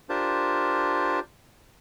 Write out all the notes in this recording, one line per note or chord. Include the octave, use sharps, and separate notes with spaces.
D4 F4 G4 A#4 C5 A5